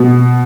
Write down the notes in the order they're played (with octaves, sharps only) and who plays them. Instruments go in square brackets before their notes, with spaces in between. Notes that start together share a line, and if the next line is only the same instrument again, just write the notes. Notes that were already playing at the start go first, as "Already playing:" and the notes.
Already playing: [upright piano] B2